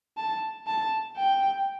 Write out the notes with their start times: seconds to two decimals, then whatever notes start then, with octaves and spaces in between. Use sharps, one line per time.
0.17 A5
0.67 A5
1.16 G5